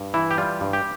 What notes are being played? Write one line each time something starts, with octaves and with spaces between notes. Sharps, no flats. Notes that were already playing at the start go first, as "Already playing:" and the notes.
Already playing: G2
E3 E4
G4
G3 F4
G2
G4